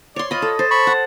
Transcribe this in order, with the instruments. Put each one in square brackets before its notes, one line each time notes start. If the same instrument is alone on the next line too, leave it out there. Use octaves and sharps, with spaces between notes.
[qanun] C#5 C6 [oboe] D5
[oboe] F4 [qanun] D#5 B5
[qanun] A4
[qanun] C5 [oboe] A5
[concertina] B5 C#6
[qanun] F#5